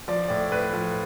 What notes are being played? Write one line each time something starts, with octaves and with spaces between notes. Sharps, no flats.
F3 D5
A2 D5
A2 B4
F3